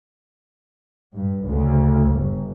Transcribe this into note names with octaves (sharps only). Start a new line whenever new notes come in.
G2
D2 C#3
G1